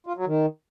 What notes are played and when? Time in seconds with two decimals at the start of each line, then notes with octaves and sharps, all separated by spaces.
0.07 F4
0.16 F#3
0.26 D#3